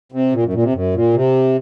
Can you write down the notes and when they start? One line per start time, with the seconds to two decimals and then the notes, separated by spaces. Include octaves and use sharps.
0.12 C3
0.33 A#2
0.43 F#2
0.53 A#2
0.63 C3
0.73 F#2
0.94 A#2
1.14 C3